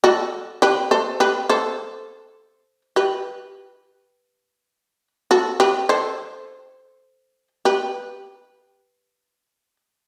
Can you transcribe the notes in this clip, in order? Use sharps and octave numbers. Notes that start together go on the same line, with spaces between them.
F#4 A4
G4 B4
A4 C5
G4 B4
A4 C5
G4 B4
F#4 A4
G4 B4
A4 C5
G4 B4